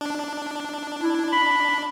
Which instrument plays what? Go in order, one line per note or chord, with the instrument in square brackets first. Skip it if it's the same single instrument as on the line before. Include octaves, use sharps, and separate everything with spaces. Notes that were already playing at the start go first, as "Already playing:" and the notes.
[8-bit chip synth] D4
[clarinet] E4
B5